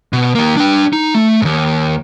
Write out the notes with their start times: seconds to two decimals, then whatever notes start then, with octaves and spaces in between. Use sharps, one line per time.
0.13 B2
0.35 D#3 A#3
0.57 D4 G5
0.93 D#4
1.15 A3
1.42 D#2 G#2